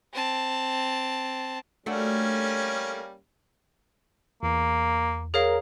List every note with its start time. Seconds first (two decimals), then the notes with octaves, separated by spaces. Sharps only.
0.13 C4 A5
1.86 G3 A3 A#3 C#4 D4 F#4
4.43 E2 A#3
5.34 G#4 A#4 C#5 F5